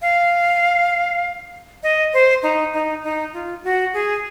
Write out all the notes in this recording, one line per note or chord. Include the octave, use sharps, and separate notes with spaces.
F5
D#5
C5
D#4
D#4
D#4
F4
F#4
G#4